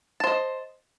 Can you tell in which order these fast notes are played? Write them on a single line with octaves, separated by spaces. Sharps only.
A5 C5 D#5